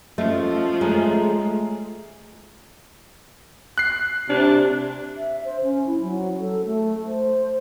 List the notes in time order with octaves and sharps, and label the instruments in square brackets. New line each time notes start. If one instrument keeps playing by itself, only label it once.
[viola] F3 [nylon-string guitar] A3 [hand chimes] C#4 D#5
[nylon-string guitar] G#3 [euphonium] A3 [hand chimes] C#5 G#5 A#5
[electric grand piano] F#6 C7
[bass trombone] C3 [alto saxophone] D4
[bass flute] E5
C5
C#4
E4
F#3
A4
A3
C5